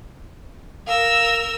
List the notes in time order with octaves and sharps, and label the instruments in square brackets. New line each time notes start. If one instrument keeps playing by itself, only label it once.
[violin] A#4 E6 [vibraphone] F5